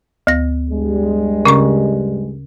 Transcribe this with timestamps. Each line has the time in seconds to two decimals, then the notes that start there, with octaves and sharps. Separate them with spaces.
0.27 D2 A#6
0.70 G2 G3 G#3
1.45 C#3 C#4 C#6